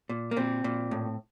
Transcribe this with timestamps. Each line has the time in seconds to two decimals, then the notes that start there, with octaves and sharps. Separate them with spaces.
0.09 A#2
0.31 A#3
0.37 A#2 C4
0.64 A#2
0.91 A2